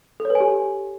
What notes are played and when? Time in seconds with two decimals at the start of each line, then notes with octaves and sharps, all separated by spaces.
0.20 A4
0.25 C#5
0.30 B4
0.35 G#5
0.40 G4